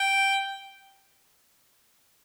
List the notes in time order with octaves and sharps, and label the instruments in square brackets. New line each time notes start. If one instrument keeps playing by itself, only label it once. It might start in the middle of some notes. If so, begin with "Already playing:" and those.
Already playing: [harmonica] G5